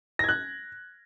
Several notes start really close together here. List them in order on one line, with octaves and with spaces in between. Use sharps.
A#6 G#6 F#6